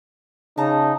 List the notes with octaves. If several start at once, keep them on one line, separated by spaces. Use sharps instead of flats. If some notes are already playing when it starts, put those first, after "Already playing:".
C#3 D#4 A5 A#5